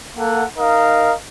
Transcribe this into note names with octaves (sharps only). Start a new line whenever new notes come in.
A#3 A4 F#5
D#4 A#4 D#5 F5